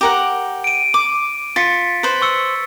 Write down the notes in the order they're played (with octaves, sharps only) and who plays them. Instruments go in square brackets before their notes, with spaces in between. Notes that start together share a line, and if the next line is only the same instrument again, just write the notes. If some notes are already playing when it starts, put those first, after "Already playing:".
[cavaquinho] G4 A#4 F#5
[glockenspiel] D7 D#7
[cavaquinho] D6
[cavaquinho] F4 [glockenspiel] A6 B6 C#7
[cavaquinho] B4 C5
[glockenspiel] C#6 E6 C#7